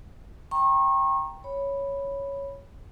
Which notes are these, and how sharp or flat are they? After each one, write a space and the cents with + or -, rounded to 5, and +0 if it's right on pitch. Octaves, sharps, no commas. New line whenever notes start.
G5 +0 A#5 +0 C#6 -35
C#5 +0 B5 +0